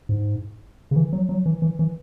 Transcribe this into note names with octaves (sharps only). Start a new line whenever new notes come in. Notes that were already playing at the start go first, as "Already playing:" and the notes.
G#2
C#3
E3
F#3
F#3
E3
E3
E3